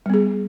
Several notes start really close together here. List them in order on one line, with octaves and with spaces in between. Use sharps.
G3 B3 G#4